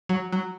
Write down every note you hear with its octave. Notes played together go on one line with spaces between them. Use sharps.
F#3
F#3